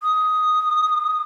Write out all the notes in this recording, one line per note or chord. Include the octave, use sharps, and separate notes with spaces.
D#6